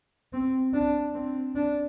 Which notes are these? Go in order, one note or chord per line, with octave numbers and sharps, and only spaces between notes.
C4
D4
C4
D4